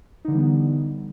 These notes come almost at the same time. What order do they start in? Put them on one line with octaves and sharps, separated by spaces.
D#4 D3 E3 G3 B3